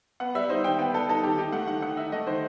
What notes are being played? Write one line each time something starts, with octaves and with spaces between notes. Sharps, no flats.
B3 F#5
G3 E5
D#4 C5
D#3 G5
B3 G5
G3 A4
D#4 A4
D#3 G4
D#4 G4
A3 F#5
D#3 F#5
D#3 F#5
D#4 E5
A3 D#5
D#3 C5